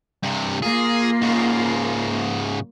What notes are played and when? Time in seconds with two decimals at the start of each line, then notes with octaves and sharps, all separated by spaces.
0.23 G2 C3
0.62 A#3 F4 G#4
1.22 G#2 C#3